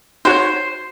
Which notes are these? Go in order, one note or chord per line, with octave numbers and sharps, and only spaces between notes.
D#4 F#4 C5 C#5